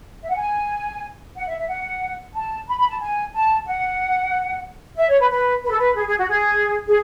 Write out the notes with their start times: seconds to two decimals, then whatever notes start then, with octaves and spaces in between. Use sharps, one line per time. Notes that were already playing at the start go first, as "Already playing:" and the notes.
0.23 E5
0.29 F#5
0.36 G#5
1.36 F#5
1.47 E5
1.58 E5
1.68 F#5
2.34 A5
2.67 B5
2.78 B5
2.89 A5
3.01 G#5
3.33 A5
3.66 F#5
4.97 E5
5.09 C#5
5.20 B4
5.30 B4
5.64 B4
5.71 A4
5.78 B4
5.96 G#4
6.07 G#4
6.18 F#4
6.29 G#4
6.88 G#4